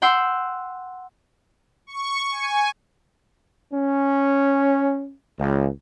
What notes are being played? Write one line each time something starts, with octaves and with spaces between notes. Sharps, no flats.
F#5 G5 C6 E6
C#6
G#5
C#4
C#2